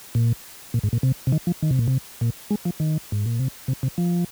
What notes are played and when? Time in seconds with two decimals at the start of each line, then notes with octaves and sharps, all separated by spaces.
0.15 A#2
0.74 A#2
0.83 G#2
0.93 A#2
1.03 C3
1.27 C3
1.32 D#3
1.47 F3
1.62 D#3
1.71 C3
1.79 A#2
1.88 C3
2.21 A#2
2.50 G#3
2.65 F3
2.80 D#3
3.12 G#2
3.26 A#2
3.39 C3
3.68 C3
3.83 C3
3.98 F3